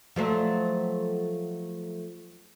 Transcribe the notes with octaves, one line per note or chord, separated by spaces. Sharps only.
F3 F#3 A3